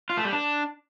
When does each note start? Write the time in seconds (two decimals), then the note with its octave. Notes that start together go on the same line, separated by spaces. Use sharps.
0.10 F4
0.17 A3
0.25 G3
0.33 D4